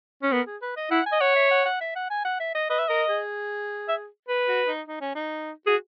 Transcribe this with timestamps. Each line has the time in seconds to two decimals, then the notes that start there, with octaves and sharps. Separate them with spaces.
0.23 C#4
0.32 B3 A#4
0.46 G#4
0.62 B4
0.76 D#5
0.91 E4 F#5
1.06 G#5
1.12 D#5
1.21 C#5 F#5
1.36 E5
1.51 F#5
1.65 F#5
1.81 E5
1.96 F#5
2.10 G#5
2.25 F#5
2.40 E5
2.55 D#5
2.70 B4 D#5
2.79 E5
2.88 A#4 D#5
3.09 G#4
3.88 E5
4.28 B4
4.48 F#4
4.68 D#4
4.87 D#4
5.01 C#4
5.15 D#4
5.66 F#4 G#4